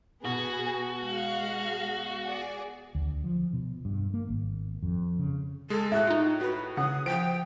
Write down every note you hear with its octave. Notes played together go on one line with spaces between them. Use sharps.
B2 B3 F#4 G#4
G#3 F5
G#4 D5
D2
F3
B2
G2
A#3
G#1
F2
C#3
G#3 G#4 A4
A2 F#4 E5
D#4 F4
F#4 B4
C#3 F#5 D#6
F3 G5 D7